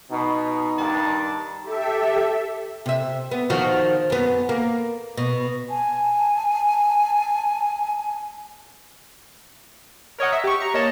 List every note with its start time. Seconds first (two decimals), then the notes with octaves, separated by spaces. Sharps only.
0.11 B2 D#4
0.77 G2 D#3 A5
1.62 G4 A4 E5
2.86 C3 E5
3.31 B3
3.50 D#3 F3 F#4
4.10 F#2 B3
4.49 A#3
5.17 B2
5.68 G#5 A5
10.19 A#4 C#5 D#5 F#5
10.32 E5
10.44 G4 C#6
10.60 A#5 C#6
10.74 A#3 C#5 D#5 A5